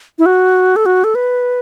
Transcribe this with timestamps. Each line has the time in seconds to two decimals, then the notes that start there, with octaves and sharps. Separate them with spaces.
0.19 E4
0.26 F#4
0.76 A4
0.86 F#4
1.04 A4
1.15 B4